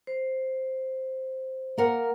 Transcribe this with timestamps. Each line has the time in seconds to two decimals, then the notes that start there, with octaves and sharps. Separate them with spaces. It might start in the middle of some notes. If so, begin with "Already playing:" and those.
0.07 C5
1.78 A#3 A#4 F#5